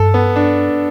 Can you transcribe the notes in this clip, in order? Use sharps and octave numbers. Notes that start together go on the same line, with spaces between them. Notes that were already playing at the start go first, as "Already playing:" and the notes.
Already playing: G2 A4
B3
D4